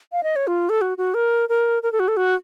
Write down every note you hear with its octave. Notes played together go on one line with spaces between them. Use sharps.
F5
D#5
C#5
F4
A4
F#4
F#4
A#4
A#4
A#4
A4
F#4
A4
F#4